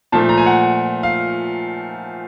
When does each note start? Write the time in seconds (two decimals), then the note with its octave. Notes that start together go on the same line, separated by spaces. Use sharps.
0.12 A#2 F3 A3 A5
0.29 A#5
0.38 G#5
0.46 F#5
1.03 F5